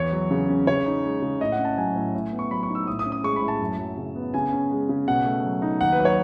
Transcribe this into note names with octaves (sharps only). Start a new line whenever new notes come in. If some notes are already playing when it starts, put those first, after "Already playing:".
Already playing: E2 C#5
F#3
C#3
C#4
C#3 C#5
D#4
G#3
C#3
A2 D#5
F#5
C#4
A5
F#3 G#5
A2
A2
B3
C#6
F#3 B5
C#6
D#4
E6
A2 D#6
D#6
C#4
D#6
G#3 C#6
B5
A2
A5
F#2
F#3
C#3
B3
C#3 G#5
C#4
G#3
C#3
B2 F#5
A3
F#3
D#4
D#2 F#5
B4
F#3
C#5